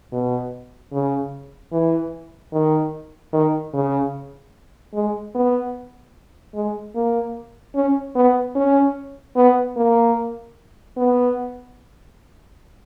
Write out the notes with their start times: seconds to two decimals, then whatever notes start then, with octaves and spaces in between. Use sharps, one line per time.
0.12 B2
0.92 C#3
1.72 E3
2.53 D#3
3.33 D#3
3.74 C#3
4.94 G#3
5.35 B3
6.55 G#3
6.95 A#3
7.75 C#4
8.16 B3
8.56 C#4
9.36 B3
9.76 A#3
10.97 B3